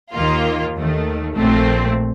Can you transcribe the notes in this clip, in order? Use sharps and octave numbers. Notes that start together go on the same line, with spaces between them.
D#2 D#3 A#3 F4
D#2 D#3 A3
A#1 A#2 A3 C4